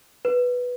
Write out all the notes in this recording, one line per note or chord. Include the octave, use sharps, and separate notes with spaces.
B4